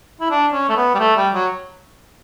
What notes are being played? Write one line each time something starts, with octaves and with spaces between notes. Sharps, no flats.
E4
D4
C#4
A3
B3
G3
A3
G3
F#3